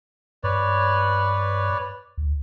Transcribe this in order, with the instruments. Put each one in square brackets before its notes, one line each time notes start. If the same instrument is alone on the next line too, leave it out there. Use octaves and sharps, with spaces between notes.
[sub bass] G2 [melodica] B4 C#5 D5
[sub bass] D2